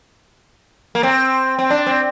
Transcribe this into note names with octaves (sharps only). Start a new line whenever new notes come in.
A#3
C4
C4
D4
C4